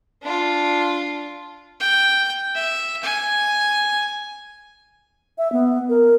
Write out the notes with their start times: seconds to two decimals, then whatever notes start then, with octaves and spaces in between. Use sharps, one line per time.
0.22 D4 F4
1.80 G5
2.55 E5
3.03 G#5
5.38 E5
5.52 B3
5.89 A#4